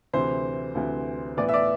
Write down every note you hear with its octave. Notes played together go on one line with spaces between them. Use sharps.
D2 C3 E3 C5
D2 C3 E3
A2 E3 B3 E4 D5
E5
D5